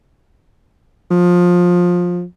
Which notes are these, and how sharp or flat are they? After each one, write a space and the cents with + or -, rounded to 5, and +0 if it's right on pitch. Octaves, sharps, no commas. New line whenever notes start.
F3 +20